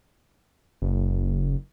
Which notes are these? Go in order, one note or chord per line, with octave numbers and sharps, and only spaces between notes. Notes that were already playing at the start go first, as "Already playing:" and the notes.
F#1